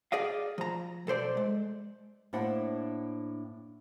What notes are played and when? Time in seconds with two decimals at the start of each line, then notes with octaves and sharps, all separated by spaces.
0.12 G#4 D5 D#5 F5
0.58 F3 A#5
1.07 B1 A4 C5 D5
1.37 G#3
2.33 A2 A#3 D4 E4 C5 F#5